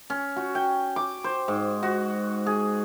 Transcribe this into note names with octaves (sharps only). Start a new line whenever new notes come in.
C#4
F#4
G5
D6
C5
G#2
F#4
G#4